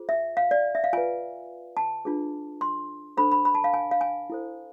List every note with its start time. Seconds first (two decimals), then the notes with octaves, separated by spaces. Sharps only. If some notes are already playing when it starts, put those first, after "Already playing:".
Already playing: F4 G#4 C5
0.09 E5
0.37 F5
0.51 D5
0.75 E5
0.84 F5
0.93 F4 B4 G#5
1.77 A5
2.05 D4 F4 G#4 B4
2.61 C6
3.17 D4 A4 C5 B5
3.31 B5
3.45 B5
3.55 A5
3.64 F5
3.74 G#5
3.91 F5
4.01 G#5
4.30 E4 A4 C5